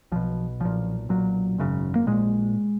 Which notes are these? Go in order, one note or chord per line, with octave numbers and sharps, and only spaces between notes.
B1 B2 F3
B1 A#2 F3
B1 A#2 F#3
G#1 F#2 C#3
A#3
A#1 A#2 G#3